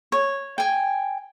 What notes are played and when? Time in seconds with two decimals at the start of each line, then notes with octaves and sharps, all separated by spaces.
0.12 C#5
0.58 G5 G#5